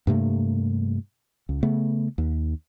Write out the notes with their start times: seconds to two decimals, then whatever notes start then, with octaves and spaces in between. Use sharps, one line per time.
0.07 G2 C3 A3 A#3
1.49 C#2
1.63 C#3 A3 B3
2.18 D#2